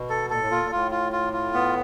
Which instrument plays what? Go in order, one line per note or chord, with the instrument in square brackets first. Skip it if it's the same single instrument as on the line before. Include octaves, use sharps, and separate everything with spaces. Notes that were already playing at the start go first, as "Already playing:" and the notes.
Already playing: [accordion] B2
[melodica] A4
[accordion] A#2 [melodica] A4
[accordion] A2
[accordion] A#2 [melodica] F4
[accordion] A#2
[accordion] A2 [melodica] F4
[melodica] F4
F4
F4
B3